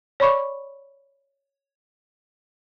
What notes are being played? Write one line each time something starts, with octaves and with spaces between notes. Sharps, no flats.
C#5 D5 B5 C#6 D6